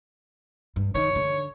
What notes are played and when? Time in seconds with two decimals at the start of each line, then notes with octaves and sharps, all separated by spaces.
0.76 G2
0.95 D#3 C#5
1.16 D3